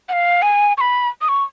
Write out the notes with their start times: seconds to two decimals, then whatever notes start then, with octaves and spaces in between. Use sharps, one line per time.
0.09 F#5
0.13 F5
0.42 G#5
0.77 C#6
0.81 B5
1.21 D#6
1.29 C#6